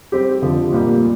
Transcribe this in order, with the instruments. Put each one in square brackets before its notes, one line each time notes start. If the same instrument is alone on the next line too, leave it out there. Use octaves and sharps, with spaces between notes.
[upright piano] G3 C4 G4
F2 D3 F3
A#2 G3 A#3